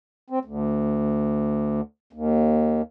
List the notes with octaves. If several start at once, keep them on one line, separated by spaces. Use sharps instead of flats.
C4
D2
D#2